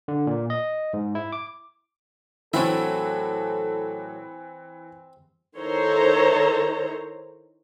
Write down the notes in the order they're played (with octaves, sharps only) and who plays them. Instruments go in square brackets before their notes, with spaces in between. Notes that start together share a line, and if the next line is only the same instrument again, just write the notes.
[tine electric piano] D3
A#2
D#5
G#2
E4
D6
[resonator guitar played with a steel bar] A2 F#3 [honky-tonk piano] E3 [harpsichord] C4 E4 E5 [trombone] A4
[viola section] D#3 E4 A4 C5 C#5 A#5